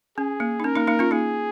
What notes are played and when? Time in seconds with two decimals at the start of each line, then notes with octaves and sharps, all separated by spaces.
0.17 C#4 G#4
0.40 A#3
0.60 D#4
0.64 C#4 A#4
0.76 A#3 D#4
0.87 A#3 D#4
0.99 C#4 F4
1.11 A#3 D#4 G#4